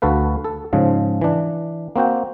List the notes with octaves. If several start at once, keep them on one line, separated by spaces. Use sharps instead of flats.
D2 F#4 A4 B4 F5
A4
G#2 C#3 F3
E3 D4
A#3 C4 F#4 G5